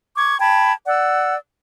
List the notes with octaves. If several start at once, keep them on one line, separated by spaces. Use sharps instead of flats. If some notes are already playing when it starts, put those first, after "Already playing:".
C#6 D6 G#6
G5 A5 B5 G#6
D5 F#5 E6